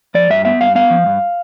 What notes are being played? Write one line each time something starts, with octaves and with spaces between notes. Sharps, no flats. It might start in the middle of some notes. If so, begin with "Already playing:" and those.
F3 D5
G2 E5
B3 E5
G2 F5
B3 F5
F3
G2